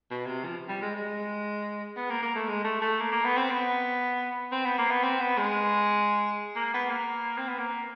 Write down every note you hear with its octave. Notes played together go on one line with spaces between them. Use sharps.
B2
C3
F3
G3
G#3
G#3
B3
A#3
A#3
A3
G#3
A3
A3
A#3
A#3
B3
C4
B3
C4
B3
A#3
B3
C4
B3
G#3
A#3
B3
A#3
C4
B3
A#3